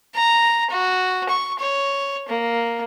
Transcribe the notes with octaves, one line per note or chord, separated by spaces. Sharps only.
A#5
F#4
C#6
C#5
A#3